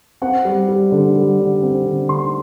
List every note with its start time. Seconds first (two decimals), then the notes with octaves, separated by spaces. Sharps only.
0.22 C4 F#5
0.45 G3
0.68 G3
0.92 D3
1.16 G3
1.39 D3
1.63 C4
1.86 D3
2.09 D3 C6